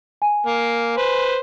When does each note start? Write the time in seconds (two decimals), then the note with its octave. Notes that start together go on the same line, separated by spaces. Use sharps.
0.22 G#5
0.46 A#3
0.97 B4 C5